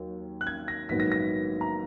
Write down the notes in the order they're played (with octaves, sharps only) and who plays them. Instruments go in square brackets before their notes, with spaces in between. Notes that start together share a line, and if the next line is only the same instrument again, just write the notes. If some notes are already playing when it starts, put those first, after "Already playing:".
Already playing: [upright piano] D#2 D#3 F#3
F#6
G#6
A#6
A#1 G#2 D#3 F#3 B3 B6
A#6
A#6
A#5